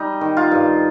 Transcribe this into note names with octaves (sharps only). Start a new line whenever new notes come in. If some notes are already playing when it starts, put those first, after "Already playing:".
Already playing: G3 D#4
D#3
F4
G2